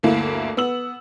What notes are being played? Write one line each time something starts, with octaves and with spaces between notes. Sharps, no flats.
G1 D2 A#3 E4
B3 E6 F#7